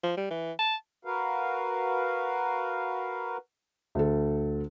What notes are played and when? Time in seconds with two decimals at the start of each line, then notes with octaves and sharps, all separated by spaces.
0.03 F3
0.17 G3
0.31 E3
0.59 A5
1.05 F#4 A#4 B4 F5
3.95 D2 A4